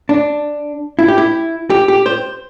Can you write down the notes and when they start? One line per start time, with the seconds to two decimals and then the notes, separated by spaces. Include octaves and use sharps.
0.09 D4
0.99 E4
1.08 G4
1.18 E4
1.70 G4
1.88 G4
2.06 C5